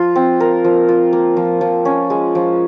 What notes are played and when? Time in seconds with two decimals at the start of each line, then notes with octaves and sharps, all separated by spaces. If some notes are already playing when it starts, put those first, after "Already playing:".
Already playing: F3 F4
0.16 C4
0.40 A#4
0.64 F3
0.89 F4
1.13 A#3
1.37 F3
1.61 F3
1.85 C#4
2.10 G#3
2.35 F3